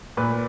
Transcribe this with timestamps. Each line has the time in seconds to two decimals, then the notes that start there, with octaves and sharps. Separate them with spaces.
0.17 A#2 B4